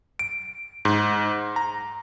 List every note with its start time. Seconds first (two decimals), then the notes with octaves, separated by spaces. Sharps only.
0.19 D7
0.85 G#2
1.56 A#5